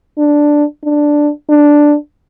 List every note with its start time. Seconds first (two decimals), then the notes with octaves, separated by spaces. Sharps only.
0.18 D4
0.84 D4
1.49 D4